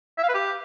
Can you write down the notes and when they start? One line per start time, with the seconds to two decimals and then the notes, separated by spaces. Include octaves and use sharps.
0.18 E5
0.24 F5
0.29 B4
0.34 G4